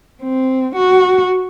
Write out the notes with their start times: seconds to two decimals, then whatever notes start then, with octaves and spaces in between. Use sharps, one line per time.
0.23 C4
0.75 F#4